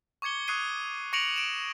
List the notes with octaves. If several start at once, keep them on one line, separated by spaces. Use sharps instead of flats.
C#6 D6 G#6 C#7 G7
C#6 D#6 F#6 G#6 C7 D#7
C#6 A#6 C#7 D7 F7 F#7
D7 E7